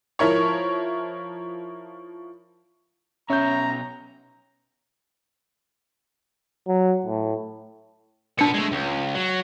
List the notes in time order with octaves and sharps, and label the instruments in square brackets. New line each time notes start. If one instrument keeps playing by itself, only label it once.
[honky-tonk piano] F3 E4 A#4 C#5
[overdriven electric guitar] B2 C#5 [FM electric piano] C#4 [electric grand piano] E5 G6 [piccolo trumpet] A#5
[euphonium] F#3
A2
[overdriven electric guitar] A#2 B3 [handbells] D4 C#7
[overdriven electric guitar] G#3 A3
C#2
F#3